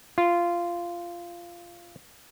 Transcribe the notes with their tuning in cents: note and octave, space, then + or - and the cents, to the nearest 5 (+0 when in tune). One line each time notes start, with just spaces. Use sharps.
F4 -15